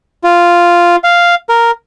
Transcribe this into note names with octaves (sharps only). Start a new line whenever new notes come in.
F4
F5
A#4